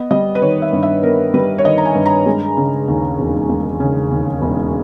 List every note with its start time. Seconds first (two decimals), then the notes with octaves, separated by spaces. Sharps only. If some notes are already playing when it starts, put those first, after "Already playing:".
Already playing: B3 D#5
0.11 G3 D#5
0.35 B4
0.42 D#3 C#5
0.62 E5
0.73 G2
0.83 E5
1.03 B3 A#4
1.34 G3 B4
1.58 C#5
1.65 D#3 D#5
1.78 A#5
1.85 G#5
1.95 G2
2.06 A#5
2.26 G#3
2.57 C#3
2.88 D#2
3.19 E1
3.49 G#3
3.80 C#3
4.11 D#2
4.42 E1